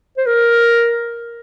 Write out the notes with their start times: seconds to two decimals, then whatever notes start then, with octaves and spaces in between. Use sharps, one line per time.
0.18 C5
0.26 A#4